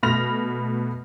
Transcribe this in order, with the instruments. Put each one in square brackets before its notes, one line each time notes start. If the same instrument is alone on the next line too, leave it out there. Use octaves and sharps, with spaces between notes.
[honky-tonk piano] B2 A3 B5 F6 A#6 F7